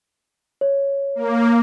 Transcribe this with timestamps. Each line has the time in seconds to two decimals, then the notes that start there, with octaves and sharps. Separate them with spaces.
0.61 C#5
1.15 A#3